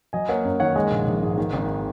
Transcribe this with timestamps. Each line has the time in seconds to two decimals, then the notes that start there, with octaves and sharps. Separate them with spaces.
0.13 F#3 D#5 G#5
0.29 A#3 C#5 F#5
0.44 F#2
0.60 D#3 C#5 F#5
0.76 G#3 D#5 G#5
0.91 A#1
1.07 A#1
1.22 G#2
1.38 D#3
1.53 G#1